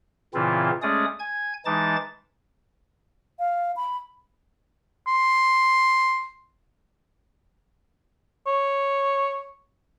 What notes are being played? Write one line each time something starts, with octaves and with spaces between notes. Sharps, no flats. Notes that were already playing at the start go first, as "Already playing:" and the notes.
A#2 C#3 E3 C4 E4 F4
G#3 A3 C#4 G#4 D5 D#6
G#5 G#6
E3 G#3 D#4 A5 D6 A6
F5
B5
C6
C#5